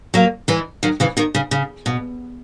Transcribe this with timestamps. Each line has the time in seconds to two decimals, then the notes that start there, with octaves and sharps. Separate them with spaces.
0.14 F#3 A#3
0.48 E3 G#3
0.83 D#3 F#3
1.00 C#3 E3
1.17 B2 D#3
1.35 C#3
1.51 C#3
1.86 B2